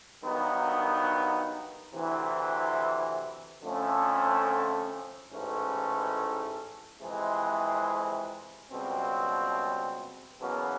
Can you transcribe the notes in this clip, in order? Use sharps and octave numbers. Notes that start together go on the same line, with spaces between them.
G2 D#3 F#3 B3 D#4
D2 C3 E3
F2 D3 F3 A3 C#4
A1 G#2 E3 A3 C#4
F2 C3 E3 G#3
C#2 B2 G3 C4
E2 B2 F#3 A#3 C#4